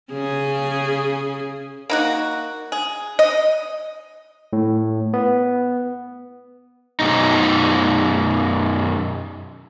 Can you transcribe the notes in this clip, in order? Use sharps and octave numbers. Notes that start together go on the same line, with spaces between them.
C#3 G#4
A#3 D#4 F#4
G#4
D#5
A2
B3
F#2 B2 D#4